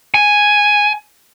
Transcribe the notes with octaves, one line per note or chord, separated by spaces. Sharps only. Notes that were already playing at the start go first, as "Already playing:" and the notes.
G#5